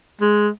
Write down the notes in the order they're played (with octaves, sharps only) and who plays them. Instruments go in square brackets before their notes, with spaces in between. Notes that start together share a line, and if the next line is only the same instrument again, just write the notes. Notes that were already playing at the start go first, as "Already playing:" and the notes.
[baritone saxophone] G#3